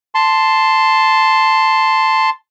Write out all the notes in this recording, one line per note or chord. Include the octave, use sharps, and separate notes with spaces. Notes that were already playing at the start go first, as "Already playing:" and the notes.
A5 C6